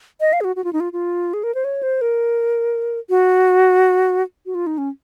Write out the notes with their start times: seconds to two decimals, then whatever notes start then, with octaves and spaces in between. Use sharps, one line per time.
0.20 D#5
0.33 F5
0.41 G#4
0.44 F#4
0.56 F#4
0.64 F4
0.73 D#4
0.80 F4
0.93 F4
1.34 G#4
1.43 A#4
1.55 C5
1.64 C#5
1.83 C5
2.01 A#4
3.10 F#4
4.46 F#4
4.55 F4
4.67 D#4
4.78 C#4